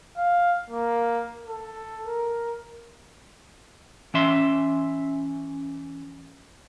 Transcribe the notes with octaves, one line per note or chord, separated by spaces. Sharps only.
F5
A#3
A4
A#4
E3 C#4 E5 C6